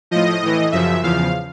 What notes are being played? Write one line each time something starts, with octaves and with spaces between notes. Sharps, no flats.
A2 F3 D#5
A2 E3
F#2 C#3 F3 E5
E2 C#3 F3 F5